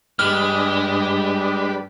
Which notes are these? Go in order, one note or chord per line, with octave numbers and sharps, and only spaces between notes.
G2 G3 G#3 D4 B4 F6